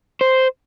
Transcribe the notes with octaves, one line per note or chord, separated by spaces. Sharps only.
C5